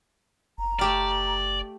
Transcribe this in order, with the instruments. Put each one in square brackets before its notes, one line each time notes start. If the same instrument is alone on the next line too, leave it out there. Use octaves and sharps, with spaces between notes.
[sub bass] F#1 [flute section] A#5
[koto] A3 G4 F5 [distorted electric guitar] D5